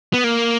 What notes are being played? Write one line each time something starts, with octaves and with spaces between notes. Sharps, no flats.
B3
A#3